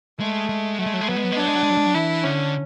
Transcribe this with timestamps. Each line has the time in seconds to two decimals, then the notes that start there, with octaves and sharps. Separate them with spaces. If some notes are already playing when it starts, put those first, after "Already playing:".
0.20 G#3 A3
0.49 G#3
0.79 F#3 A3
0.86 G#3
0.94 F#3
1.01 G#3
1.08 F#3 B3
1.16 G#3
1.24 F#3
1.32 G#3
1.36 F#3 D4
1.47 G#3
1.55 F#3
1.63 G#3
1.70 F#3
1.77 G#3
1.86 F#3
1.95 E3 E4
2.24 D3 C#4